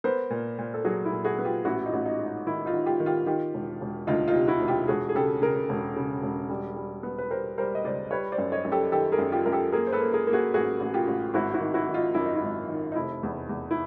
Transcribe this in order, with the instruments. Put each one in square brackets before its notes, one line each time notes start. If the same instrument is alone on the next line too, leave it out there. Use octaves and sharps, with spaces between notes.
[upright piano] B3 A#4 C5
A#2
A#2
A4
F#3 F#4 G#4
E4
A#2
F#4 G#4
B3
F4 G4
A1 E4 F#4
D#4 F4
A1
D#4
G#2
D#4
D#3 E4
D#4 F4
D#3
F4 G4
D#3
F4 G4
D#3 F4 G4
E1
E1
D2 D#4 F4
D#4 F4
C3
E4 F#4
E1
F4 G4
E1 F#4 G#4
G#4
C#3 G4 A4
C#3 G#4 A#4
E1
C#3
E1
G3
G3
B3
B4
G3 A#4 C5
G3 A#4 C5
D#5
C#2 C5 D5
G3 B4 C#5
C5 D5
F#2
C#5 D#5
F#2
G4 A4
D#3 G4 A4
G#4 A#4
F#2
F4 G4
F#2 A#4
G4 A4
A#3 G#4 A#4
C5
A4 B4
A#3
G#4 A#4
A#3
F#4 G#4
A1 F#4 G#4
A1
F4 G4
A1
G#1 E4 F#4
E4 F#4
D#3
E4 F#4
D#3
D#4 F4
F#2 E4
D#4
E4
G#1
D#3
D#4
F1 E4
E2
E2
E4